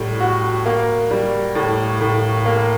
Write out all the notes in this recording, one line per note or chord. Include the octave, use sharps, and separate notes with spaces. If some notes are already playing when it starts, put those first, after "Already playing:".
Already playing: A2 G3
F#4
A#3
G3
A2
A2
A#3